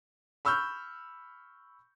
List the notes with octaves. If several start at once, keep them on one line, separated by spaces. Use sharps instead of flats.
B5 C#6 E6 F6 G6